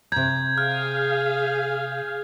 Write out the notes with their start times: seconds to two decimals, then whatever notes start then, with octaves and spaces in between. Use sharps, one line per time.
0.12 C3 A#5 G6 G#6
0.58 G#4 F5 F6